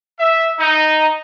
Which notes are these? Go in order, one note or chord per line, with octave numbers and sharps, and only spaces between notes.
E5
D#4